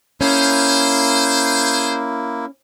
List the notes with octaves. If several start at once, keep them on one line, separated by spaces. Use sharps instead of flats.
A#3 C#4 E4 G#4 C5